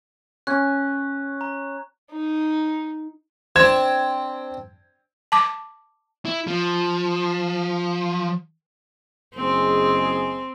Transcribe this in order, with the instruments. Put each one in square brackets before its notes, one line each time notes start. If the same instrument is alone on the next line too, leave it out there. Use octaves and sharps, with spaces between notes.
[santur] C#4 [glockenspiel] F#6
[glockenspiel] A#5
[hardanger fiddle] D#4
[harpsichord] C4 D4 [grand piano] G#6 E7
[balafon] A5 D6
[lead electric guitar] E4
F3
[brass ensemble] F#1 G#3 G#4 [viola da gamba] C4